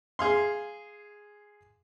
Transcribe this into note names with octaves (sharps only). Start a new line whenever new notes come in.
G#4 F5 C6